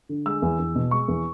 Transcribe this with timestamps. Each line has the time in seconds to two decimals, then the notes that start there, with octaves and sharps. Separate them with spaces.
0.09 D3
0.26 G#3 E6
0.42 E2
0.59 E2
0.76 B2
0.91 G#3 C#6
1.08 E2